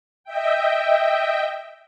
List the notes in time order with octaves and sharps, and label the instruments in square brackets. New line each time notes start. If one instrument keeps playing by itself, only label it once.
[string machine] D#5 E5 G5